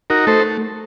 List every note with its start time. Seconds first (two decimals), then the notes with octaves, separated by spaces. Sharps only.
0.10 D#4 F#4 A#4
0.27 A3 A4 C5